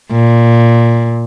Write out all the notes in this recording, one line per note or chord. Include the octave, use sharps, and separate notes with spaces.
A#2